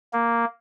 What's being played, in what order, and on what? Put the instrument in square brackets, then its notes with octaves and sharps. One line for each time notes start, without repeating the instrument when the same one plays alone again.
[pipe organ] A#3